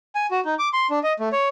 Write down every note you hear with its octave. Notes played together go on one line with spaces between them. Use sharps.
G#5
F#4
D#4
D6
C6
D4
D#5
A3
C#5